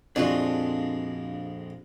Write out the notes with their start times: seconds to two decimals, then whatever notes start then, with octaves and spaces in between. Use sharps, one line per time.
0.16 A#1 F2 G#3 D4 F4 F#4